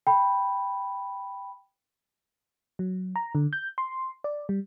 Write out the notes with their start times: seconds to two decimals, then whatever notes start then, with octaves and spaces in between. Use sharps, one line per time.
0.07 G5 B5
2.79 F#3
3.16 A#5
3.35 D3
3.53 G6
3.78 C6
4.24 D5
4.49 G3